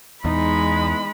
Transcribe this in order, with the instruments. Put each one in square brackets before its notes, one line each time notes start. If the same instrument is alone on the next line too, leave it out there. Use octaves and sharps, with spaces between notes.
[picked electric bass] E2 [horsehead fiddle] G#3 B5 [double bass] D#4